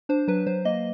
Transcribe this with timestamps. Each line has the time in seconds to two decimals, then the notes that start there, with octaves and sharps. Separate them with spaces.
0.09 D4 C5
0.28 F#3 B4
0.46 F#3 C5
0.65 A#3 D#5